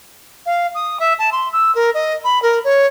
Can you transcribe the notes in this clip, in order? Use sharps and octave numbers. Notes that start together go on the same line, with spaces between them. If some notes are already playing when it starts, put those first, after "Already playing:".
F5
D#6
E5
A5
C6
E6
A#4
D#5
B5
A#4
C#5